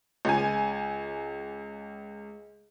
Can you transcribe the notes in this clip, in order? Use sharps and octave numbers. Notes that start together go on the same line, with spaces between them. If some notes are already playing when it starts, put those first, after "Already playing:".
C#2 G#5